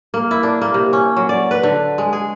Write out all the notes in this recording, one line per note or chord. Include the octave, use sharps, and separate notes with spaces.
A#3
E4
D4
A#3
C3
C#4
F#3
D5
B4
D3
G#3
G#4